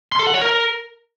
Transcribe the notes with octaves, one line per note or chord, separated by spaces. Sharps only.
C6
A4
F#5
C#5
A#4